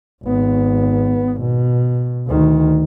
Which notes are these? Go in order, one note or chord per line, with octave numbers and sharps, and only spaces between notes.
G#1 B3
B2
D2 D#3